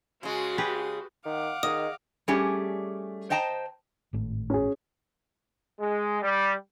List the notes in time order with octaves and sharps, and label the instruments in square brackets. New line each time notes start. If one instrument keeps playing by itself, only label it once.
[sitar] C#3 G#3 [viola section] F#4
[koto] G4 G#4 B4
[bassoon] D#3 [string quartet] F5 F#5 D6
[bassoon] D#3 [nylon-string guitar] G#4 D#5 [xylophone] D#6
[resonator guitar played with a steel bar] G3 A3 C#4 G4 G#4
C5 D#5 G5 A5 A#5
[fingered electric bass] G#1 A2
[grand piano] C#4 G#4
[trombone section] G#3
G3